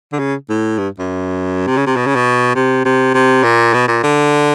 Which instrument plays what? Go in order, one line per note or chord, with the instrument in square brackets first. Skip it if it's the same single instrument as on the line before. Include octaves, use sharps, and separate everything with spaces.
[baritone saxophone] D3
C#3
A2
G2
F#2
C3
C#3
C3
B2
C#3
B2
C3
C3
C3
A#2
B2
A#2
D3